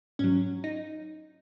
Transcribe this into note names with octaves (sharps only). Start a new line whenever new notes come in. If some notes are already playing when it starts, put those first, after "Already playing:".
G#2 F#3 C#4
D#4